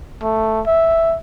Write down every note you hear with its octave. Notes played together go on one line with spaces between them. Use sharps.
A3
E5